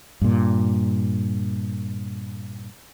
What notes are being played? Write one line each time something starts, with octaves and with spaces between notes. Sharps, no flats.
G2 A#2